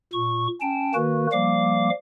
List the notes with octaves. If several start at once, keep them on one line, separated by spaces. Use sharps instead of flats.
A#2 C#6
C#4 G5 A5
D#3 A#3 F#4 B4
F3 G3 A#3 F5 D6